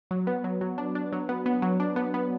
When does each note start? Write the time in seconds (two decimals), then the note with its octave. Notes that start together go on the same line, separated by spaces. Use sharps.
0.11 F#3
0.27 B3
0.44 F#3
0.61 F#3
0.78 D4
0.95 D4
1.12 F#3
1.29 B3
1.46 B3
1.62 F#3
1.80 D4
1.96 B3
2.14 B3